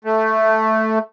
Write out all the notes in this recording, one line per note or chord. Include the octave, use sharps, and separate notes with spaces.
A3